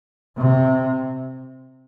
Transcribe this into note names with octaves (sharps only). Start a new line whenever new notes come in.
C3